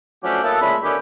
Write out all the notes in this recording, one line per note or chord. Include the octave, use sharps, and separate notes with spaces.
F3 F#3 A3 C#4 D4 G4
F#3 A#3 B3 E4 A4
A#2 C#3 G#3 A3 E5 B5
D3 D#3 B3 C#4 E4 G4